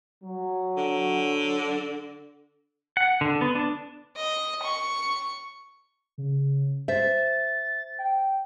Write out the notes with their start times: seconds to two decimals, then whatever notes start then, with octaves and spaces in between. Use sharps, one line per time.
0.24 F#3
0.77 D3
2.97 F#5
3.21 D3
3.41 B3
3.55 D4
4.16 D#5
4.63 C#6
6.18 C#3
6.88 C5 E5 A6
7.99 G5